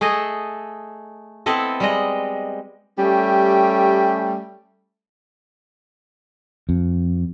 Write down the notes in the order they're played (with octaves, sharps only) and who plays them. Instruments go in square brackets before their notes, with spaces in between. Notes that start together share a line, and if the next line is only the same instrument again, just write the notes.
[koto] A3 G#4 A4 D#5
B3 C4 E4 A4 D#5
G3 G#3 D#5
[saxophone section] G3 A3 C#4 G4
[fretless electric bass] F2